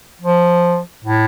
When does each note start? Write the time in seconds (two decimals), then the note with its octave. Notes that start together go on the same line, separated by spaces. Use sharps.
0.22 F3
1.05 A2